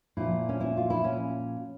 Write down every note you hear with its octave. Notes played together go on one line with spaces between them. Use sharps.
A#2 F3 E4
C#4
E4
F4
E4
C#4